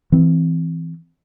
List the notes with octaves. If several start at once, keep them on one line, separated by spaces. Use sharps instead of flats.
E3 C4